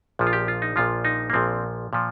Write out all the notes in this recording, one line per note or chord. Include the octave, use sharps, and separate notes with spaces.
A#1 A#2 F3
F4
G4
F4
D#4
A#1 A#2 F3 F4
D#4
A#3
A#1 A#2 F3 C4
A#2 F3